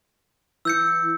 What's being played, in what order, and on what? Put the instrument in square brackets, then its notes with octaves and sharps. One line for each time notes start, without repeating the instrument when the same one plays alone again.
[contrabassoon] E3 [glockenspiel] E6 G6 C#7